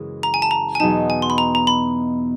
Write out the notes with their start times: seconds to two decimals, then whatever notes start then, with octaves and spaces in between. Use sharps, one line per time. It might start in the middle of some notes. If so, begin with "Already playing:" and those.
Already playing: F#2 C#3 E3 G#3
0.23 A#5
0.34 G#5
0.42 A5
0.51 A#5
0.75 G#5
0.80 E2 B2 F#3 B3 D#4 A5
1.10 G#5
1.22 C6
1.30 B5
1.38 A#5
1.55 A#5
1.67 B5